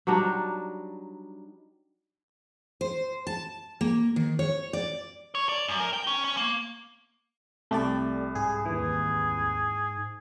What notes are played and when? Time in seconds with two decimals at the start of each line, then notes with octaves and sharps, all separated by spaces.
0.07 F#3 G3 D4 D#4
2.81 C5
3.27 A5
3.81 A#3
4.16 D#3
4.39 C#5
4.73 D5
5.35 C#5
5.49 D5
5.68 F#2
5.80 A#4
5.93 G5
6.07 C#4
6.24 C#4
6.37 A#3
7.71 C2 A3 G4 D5
8.35 G#2 G#4
8.65 D#2 E3 G#4